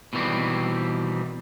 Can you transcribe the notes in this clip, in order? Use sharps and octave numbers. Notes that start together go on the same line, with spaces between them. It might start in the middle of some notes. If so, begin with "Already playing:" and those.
B2 D#3 E3 G3 C4